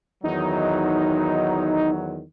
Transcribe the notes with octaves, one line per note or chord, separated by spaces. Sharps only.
E2 D#3 F#3 D#4